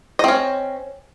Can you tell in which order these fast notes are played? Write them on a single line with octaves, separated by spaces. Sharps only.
D#5 C4 C#4